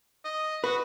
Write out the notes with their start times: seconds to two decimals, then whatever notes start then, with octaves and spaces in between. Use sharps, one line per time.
0.25 D#5
0.64 F#4 B4